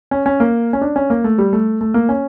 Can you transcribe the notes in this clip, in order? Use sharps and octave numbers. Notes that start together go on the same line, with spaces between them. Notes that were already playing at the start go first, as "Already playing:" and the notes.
C#4
C#4
A#3
C#4
D4
C#4
A#3
A3
G3
A3
A3
A#3
C#4